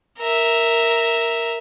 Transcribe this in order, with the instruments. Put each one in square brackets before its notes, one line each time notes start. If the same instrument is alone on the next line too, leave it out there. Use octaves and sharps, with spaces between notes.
[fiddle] A#4 E5